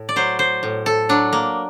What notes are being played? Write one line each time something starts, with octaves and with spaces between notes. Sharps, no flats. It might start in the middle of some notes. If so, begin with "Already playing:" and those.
Already playing: A2
D5
F#3 C5
C5
A2
A4
F#3 D4
A#3